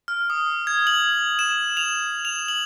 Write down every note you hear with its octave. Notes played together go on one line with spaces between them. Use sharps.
F6
D#6
G#6
F#7
E7
F7
F7
F#7